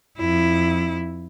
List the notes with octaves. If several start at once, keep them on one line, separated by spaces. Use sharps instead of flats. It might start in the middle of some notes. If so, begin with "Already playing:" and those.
F2 E4